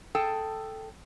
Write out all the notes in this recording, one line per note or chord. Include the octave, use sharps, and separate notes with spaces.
G#4 A4 G5 A5